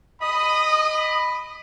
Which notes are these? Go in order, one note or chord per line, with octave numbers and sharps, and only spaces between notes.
D#5 B5 D#6